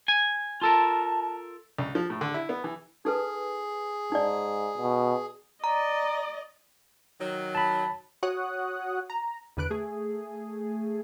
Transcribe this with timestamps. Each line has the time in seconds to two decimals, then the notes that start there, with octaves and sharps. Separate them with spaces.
0.08 G#5
0.61 F4 A4 A#4 A5
1.79 C#2
1.95 F3
2.10 A2
2.21 D3
2.34 E4
2.49 B3
2.64 E3
3.05 D#4 G#4 A4 B4
4.12 G#2 D#4 D5
4.77 B2
5.64 D5 D#5 A#5
7.20 D#3 F#3
7.55 A5 B5
8.23 F#4 C#5 F#5 D#6 F#6
9.10 A#5
9.57 E2 D3 B4 F#6 D7
9.70 A3 G#4